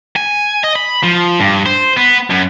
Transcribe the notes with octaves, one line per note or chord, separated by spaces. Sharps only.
G#5
D#5
B5
F3
G2
C5
B3
F#2